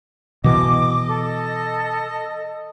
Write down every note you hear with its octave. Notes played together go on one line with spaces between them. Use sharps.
B2 E3 D#5 D6
A4